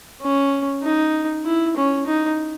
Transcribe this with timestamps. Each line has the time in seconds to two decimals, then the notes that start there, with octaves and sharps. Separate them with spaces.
0.21 C#4
0.83 D#4
1.45 E4
1.76 C#4
2.06 D#4